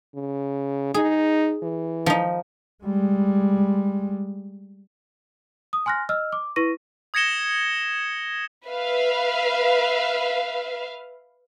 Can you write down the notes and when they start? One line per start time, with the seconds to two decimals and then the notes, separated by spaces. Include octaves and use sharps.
0.15 C#3
0.94 D#4 G#4
1.63 E3
2.06 F3 D#4
2.84 G3 G#3
5.73 D#6
5.86 G#5 C6 F6 F#6 A#6
6.09 D#5 E6 F6
6.33 D6
6.56 E4 B4 C#6 A#6 D#7
7.14 D#6 G#6 A#6 C#7 E7 G7
8.67 B4 E5 F5